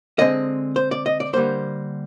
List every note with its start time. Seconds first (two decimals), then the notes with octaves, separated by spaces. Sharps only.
0.19 D3 G#3 C4 D#5
0.76 C5
0.91 D5
1.06 D#5
1.20 D5
1.33 D3 G3 A#3 C5